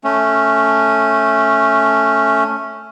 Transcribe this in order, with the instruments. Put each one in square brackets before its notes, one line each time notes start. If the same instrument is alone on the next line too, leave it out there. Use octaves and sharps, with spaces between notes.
[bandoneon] A3 C#4